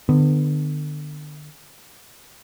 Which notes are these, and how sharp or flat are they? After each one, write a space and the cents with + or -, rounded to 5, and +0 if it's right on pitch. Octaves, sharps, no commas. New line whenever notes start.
D3 +35 B3 +15